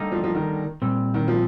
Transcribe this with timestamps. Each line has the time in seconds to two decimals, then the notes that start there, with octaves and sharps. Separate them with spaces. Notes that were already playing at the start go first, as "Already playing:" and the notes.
Already playing: D3 G3 A#3 D#4
0.12 F3
0.24 F3
0.35 D#3
0.82 A#2 G3 C4
1.14 D#3
1.28 F3